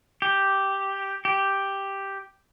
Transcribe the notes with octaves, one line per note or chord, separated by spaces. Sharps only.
G4
G4